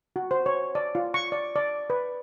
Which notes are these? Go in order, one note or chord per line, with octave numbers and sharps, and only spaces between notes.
F#4
C5
C#5
D5
F4
C#6
D5
D5
B4